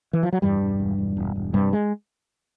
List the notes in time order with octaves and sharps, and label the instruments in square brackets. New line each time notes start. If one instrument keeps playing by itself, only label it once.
[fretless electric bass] E3
F3
F#3
E2 G2 G3
E1
E1
E1
E1
E1
G2 C3 G3
G#3